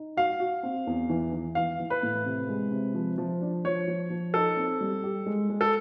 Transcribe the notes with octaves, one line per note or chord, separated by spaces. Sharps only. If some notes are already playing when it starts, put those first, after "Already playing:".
Already playing: D#4
F#4 F5
F#4
C4
E2
E3
E3
E3 F5
E3
B4
A2
C3
G#3
C3
F3
F3
D4
F3 C#5
F3
F3
D#4 A4
C4
G3
G4
G#3
G#3
A4